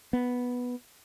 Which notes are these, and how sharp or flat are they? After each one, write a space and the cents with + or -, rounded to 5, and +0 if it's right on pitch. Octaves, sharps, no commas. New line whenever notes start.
B3 -5